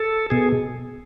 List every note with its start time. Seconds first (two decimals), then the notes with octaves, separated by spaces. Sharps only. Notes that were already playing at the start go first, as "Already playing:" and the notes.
Already playing: A4
0.30 B2 G#4